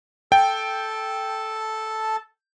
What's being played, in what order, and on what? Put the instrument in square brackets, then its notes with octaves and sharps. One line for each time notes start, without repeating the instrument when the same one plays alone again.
[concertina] A4 A5 [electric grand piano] G5